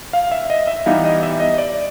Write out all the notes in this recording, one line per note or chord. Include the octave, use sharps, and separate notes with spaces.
F5
E5
D#5
E5
E3 G3 B3 D#4 F5
D#5
E5
D#5
D5